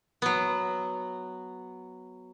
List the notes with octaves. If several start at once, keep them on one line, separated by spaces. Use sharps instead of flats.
F#3 B3